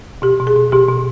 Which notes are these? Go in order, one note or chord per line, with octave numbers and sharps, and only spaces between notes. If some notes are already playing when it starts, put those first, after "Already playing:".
B2 G4
B2
G#4
B2
B2 G4
B2